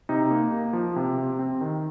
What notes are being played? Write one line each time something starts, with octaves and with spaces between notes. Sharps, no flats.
C3 D#4
A#3
A#3
F3
C3
C3
C4
D#3